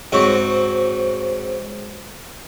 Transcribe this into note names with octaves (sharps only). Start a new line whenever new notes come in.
G#2 F#3 C4 F#4